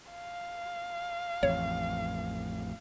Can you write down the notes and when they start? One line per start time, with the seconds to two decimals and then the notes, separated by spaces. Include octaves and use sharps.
0.12 F5
1.43 A1 F2 C#5